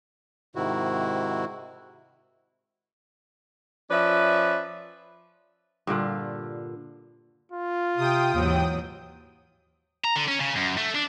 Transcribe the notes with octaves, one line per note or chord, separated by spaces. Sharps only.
G#2 C3 D#3 E4 F#4
F3 C#4 B4 D5 E5
G2 A#2 D3 F4
F4
C3 G5 D#6
D#2 G#2 E3 F#3
A#5
D3
C#4
C#3
F#2
A3
D4